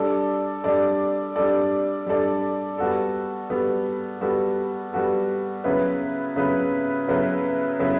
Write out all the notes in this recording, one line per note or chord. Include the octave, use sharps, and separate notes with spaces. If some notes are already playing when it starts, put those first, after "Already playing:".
Already playing: G3 D4 A4 D5
G3 D4 A4 D5
G3 D4 A4 D5
G3 D4 A4 D5
G3 B3 F#4 A4
G3 B3 F#4 A4
G3 B3 F#4 A4
G3 B3 F#4 A4
C#3 F#3 B3 E4 B4
C#3 F#3 B3 E4 B4
C#3 F#3 B3 E4 B4
C#3 F#3 B3 E4 B4